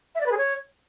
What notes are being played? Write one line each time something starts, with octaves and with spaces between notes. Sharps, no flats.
E5
D5
B4
G#4
C#5